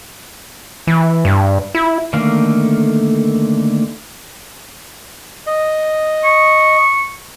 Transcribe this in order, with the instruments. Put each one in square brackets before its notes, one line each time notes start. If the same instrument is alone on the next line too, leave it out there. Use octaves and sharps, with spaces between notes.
[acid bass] E3
G2
E4
[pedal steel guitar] D3 D#3 A3 A#3 F5
[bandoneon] D#5
[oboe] C#6